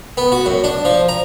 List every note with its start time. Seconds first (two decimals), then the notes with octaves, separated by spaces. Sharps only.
0.17 B3
0.32 F#4
0.46 F#2
0.64 D4
0.85 F3
1.09 A#5